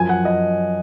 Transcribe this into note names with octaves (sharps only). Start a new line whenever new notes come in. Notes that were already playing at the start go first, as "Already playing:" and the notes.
Already playing: F#2 F3 G#5
F#5
D#5